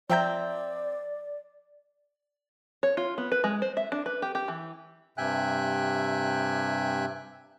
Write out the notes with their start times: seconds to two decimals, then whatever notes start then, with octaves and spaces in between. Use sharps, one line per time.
0.10 F3 C4 D5 E5 G5 A#5 G6
2.83 C#5
2.97 F4
3.18 B3
3.32 B4
3.44 G#3
3.62 C5
3.77 E5
3.92 D4
4.06 B4
4.22 G4
4.35 G4
4.48 E3
5.18 G2 C3 E5 G5 G#5 F#6